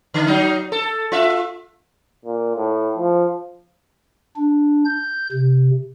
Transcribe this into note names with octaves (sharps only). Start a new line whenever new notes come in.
D3
F#3 D#4
A4
F4 E5
A#2
A2
F3
D4
G6
C3